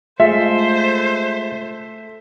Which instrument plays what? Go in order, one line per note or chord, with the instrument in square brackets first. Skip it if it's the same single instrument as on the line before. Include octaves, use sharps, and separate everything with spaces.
[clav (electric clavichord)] G#3 F4 [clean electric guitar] A3 [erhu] C5 [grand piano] E5